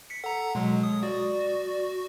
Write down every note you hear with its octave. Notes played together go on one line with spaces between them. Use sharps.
B6 C#7
A4 F#5 A#5
B2 F#3 G#3
D#6
F#4 D5